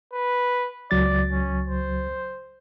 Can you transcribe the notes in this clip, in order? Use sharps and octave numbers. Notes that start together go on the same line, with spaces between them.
B4
C#2 F#3 D5 A6
C#4
C5